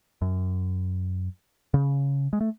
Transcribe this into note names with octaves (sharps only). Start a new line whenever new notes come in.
F#2
C#3
G#3
A3